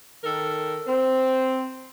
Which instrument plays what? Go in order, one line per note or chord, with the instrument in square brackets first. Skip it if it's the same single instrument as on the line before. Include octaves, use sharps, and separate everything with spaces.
[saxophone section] D#3 A4 A#4
C4